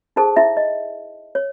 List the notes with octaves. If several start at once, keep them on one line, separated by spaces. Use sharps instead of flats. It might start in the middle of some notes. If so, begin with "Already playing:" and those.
D#4 G#4 A4 C5 A5
E4 E5
D#5
C#5